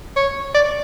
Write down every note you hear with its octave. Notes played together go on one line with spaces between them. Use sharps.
C#5
D5